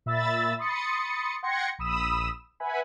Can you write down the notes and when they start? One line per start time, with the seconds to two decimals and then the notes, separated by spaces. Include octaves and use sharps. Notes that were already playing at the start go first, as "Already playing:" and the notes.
0.06 A#2 E5 B5 E6 A6
0.58 B5 C6 D#6 A6 C#7
1.43 F#5 G5 C6 G#6 A#6 C#7
1.79 A#1 B5 D#6 E6 E7
2.60 B4 E5 F#5 G#5 B5